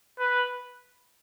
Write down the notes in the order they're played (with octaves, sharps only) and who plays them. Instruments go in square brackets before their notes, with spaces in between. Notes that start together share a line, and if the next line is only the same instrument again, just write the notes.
[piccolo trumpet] B4